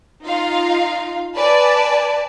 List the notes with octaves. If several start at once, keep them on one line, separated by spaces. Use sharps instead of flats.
D#4 F4 F5
B4 D5 G#5 A5